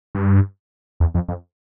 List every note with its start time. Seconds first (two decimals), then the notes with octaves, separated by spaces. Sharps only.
0.15 G2
1.00 E2
1.14 F2
1.28 F2